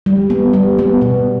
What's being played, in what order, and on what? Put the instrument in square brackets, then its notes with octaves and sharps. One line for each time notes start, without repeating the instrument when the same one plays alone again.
[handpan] G3
B3
G3
B3
B2